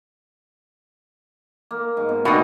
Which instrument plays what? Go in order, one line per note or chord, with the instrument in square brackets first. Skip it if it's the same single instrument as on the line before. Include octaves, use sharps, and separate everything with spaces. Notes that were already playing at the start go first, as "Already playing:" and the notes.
[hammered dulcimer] A#3
G#2
B2
[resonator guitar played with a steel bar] B2 D#4 [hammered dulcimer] G3 A3 F#4